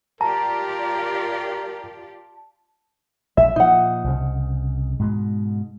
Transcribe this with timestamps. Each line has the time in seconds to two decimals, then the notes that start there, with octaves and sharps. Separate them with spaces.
0.21 F4 G4 A#4 D5 A5 A#5
3.37 A#1 E5
3.56 A#2 F3 D#4 F#5
4.04 C2 C#3
4.99 G#2 B2 G#3